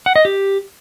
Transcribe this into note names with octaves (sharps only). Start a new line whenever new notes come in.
F#5
D#5
G4